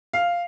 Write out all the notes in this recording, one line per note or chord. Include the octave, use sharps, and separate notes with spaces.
F5